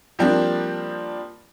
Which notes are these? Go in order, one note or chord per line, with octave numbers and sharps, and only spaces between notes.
F3 G3 A#3 C4 D4